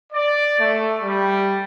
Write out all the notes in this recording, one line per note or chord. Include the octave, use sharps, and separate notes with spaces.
D5
A3
G3